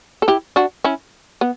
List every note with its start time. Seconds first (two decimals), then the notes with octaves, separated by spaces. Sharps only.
0.22 A4
0.28 E4 G4
0.56 D4 F#4
0.84 C#4 E4
1.41 B3